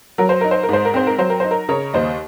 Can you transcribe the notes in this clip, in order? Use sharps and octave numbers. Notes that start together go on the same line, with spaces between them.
F#3 A#4
C5
D#4 A#4
C5
A#4
G#2 C5
A#4
C4 C5
A#4
F#3 C5
A#4
D#4 C5
A#4
C#3 A#4 C#5
D#2 C5 D#5